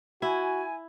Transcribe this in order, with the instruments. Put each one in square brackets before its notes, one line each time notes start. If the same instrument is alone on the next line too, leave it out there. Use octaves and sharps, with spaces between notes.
[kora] E4 [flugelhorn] F#4 [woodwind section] G#5